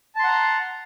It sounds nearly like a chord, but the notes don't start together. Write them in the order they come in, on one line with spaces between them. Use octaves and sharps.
A5 C6 F#5 A#5